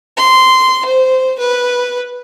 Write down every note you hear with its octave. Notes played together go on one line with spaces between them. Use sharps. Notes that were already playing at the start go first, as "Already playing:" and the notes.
C6
C5
B4